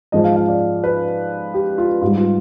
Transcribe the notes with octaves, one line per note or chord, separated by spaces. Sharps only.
G#2 F3 G#3 D#5
F5
F5
D5
B4
G4
F4
G#2 G3 F4
F4